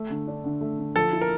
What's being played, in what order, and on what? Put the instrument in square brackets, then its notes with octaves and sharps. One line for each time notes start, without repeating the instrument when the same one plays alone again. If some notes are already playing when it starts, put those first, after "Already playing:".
Already playing: [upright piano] A3
D3
D4
D3
A3
D3
[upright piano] F3 [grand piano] A4
[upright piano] E4
[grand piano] A#4